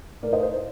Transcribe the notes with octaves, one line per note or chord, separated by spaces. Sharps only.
A2 A#4 D5
C5 D#5
C5
C5